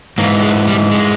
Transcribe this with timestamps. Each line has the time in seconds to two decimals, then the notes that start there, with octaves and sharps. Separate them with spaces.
0.18 G#2 E3 A#3
0.43 G#3
0.67 G3
0.91 G#3